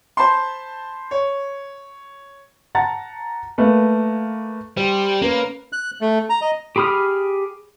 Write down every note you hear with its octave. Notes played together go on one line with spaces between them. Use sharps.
C5 A5 B5 C6
C#5
F#5 A5 A#5 A6
A3 A#3 B4
G3 C5
A#3 C#4 A#4 B4
F#6
A3
A#5
D#5
G4 G#4 B5 D#6 F6